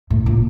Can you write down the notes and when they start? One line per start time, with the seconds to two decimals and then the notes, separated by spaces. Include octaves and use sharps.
0.10 A2
0.26 A#2